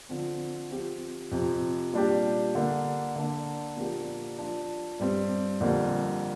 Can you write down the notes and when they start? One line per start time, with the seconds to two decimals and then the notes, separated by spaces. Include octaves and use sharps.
0.09 D3 F3 C4
0.71 F3 C4 G4
1.31 F2 C3 F3
1.93 A#2 G3 D4 G4
2.55 D3 A#3 D4
3.16 D3 A#3 D4
3.77 A#2 F3 A#3 D4 G4
4.38 F3 D4 F4
4.99 G2 G3 C4
5.61 F2 D3 G3 A#3